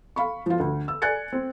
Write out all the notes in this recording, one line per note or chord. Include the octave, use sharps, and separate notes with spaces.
F5 B5 C#6
F3 F4
D2
E6
D5 G#5 F#6 G#6 A6 C#7
C4